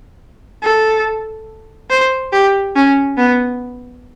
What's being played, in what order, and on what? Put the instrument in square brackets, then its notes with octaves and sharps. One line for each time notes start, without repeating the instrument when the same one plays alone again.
[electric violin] A4
C5
G4
C#4
B3